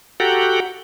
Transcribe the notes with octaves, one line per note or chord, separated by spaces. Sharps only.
F#4 G4 A4 F#5 G5 A#5